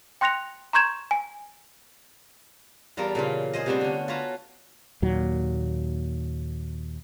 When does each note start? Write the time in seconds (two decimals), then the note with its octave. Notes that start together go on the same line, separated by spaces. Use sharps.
0.21 G5 C6 F#6 A#6 C#7 F7
0.73 A#5 C6 C#6 G6 G#6 E7
1.11 G#5
2.97 E2 G3 F4 A4 A#4 A#5
3.15 A#2 C#3 E3 F4
3.53 G#4 C5 D#5
3.66 C3 G3 A3 B3 D4 C5
3.81 D3 C#4
4.08 F4 F#4 B4 C#5 A5 A#5
5.02 D#2 A#2 F#3